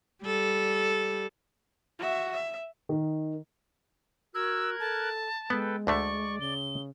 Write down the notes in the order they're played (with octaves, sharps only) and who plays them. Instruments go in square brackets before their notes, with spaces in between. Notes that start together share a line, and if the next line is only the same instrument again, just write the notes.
[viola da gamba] G3 A4
[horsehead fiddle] F#4 E5
E5
[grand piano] D#3
[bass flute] F#4 [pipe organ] A#4 F#6 G#6 [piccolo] E6
[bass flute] A4 [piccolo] A5
[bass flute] G#3 [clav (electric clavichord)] B3 [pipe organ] A4 B4 G5
[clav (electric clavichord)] D2 D3 A3 [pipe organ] D5 [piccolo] C#6
[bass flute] C#3 [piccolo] G7